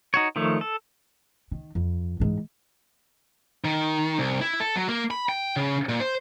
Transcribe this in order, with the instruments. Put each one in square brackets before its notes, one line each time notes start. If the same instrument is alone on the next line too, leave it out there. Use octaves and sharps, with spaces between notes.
[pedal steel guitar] D#4 F#4 C#5
D#3 F3 A3 C#5
A4
[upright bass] D#3
F2
G#2 E3
[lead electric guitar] D#3
C2
E4
A4
F#3
A#3
B5
G5
C#3
A#2
C5